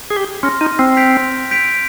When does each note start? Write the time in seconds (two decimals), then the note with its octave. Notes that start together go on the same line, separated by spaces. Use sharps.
0.10 G#4
0.16 G4
0.43 C#4 C6 F6 A#6
0.61 D#4
0.79 C4
0.97 G6 B6 D7 F7
1.51 G6 B6 D7 F7